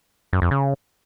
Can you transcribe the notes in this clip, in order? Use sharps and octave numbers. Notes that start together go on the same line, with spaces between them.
F#2
F2
C#3